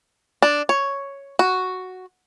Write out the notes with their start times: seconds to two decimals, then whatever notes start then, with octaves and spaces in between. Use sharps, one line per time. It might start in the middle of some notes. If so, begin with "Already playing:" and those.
0.42 D4
0.69 C#5
1.39 F#4